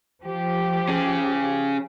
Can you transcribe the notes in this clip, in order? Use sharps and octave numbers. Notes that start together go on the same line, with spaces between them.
F3 G4
C#4 G#4